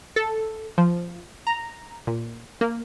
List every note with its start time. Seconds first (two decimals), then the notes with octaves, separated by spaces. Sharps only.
0.16 A4
0.78 F3
1.47 A#5
2.07 A#2
2.61 A#3